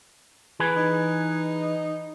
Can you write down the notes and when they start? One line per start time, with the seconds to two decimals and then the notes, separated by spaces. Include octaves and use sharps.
0.60 E3 G#4 B4
0.77 D#4